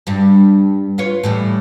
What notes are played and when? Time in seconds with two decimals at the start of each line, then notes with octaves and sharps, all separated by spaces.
0.07 G2 G3
0.98 F4 B4 C#5
1.24 A2 E3 G3